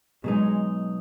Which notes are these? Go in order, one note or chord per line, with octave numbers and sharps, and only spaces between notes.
B2 F#3 G#3 D#4